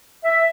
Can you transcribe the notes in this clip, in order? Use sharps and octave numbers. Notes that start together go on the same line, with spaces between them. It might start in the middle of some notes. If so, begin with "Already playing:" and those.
E5